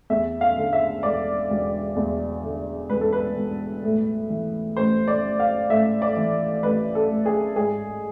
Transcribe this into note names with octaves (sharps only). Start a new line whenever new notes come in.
E2 E5
F5
D3
E5
E1 D5
E1
E2
D3
E1 B4
A4
B4
E1
A2
E3
A1 C5
D5
A1
F5
A2 E5
D5
E3
A1 B4
A4
A1
G#4
G#2 G#4